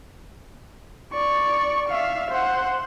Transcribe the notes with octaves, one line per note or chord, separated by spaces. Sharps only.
D5 C#6
E5 F5
C5 F#5